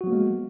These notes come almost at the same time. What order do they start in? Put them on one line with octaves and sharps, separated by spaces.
F#4 F#3 B3 A#3 G#3